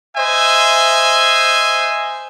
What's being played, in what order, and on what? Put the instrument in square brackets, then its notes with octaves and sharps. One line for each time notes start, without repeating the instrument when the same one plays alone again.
[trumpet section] C5 D#5 E5 G#5